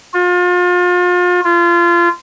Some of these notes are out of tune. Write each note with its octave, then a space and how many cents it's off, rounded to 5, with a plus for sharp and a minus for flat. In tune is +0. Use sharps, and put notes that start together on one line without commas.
F4 +35
F4 -25